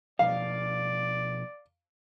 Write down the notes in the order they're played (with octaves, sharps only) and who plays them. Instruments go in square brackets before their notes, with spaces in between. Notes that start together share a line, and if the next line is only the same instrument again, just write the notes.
[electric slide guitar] B2 F3 D#4 [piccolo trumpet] D5 [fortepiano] F5